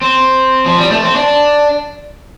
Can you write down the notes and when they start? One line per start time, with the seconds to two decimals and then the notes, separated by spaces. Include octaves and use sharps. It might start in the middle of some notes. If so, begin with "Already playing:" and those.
0.02 C4
0.66 F3
0.78 G3
0.91 A3
1.04 C4
1.16 D4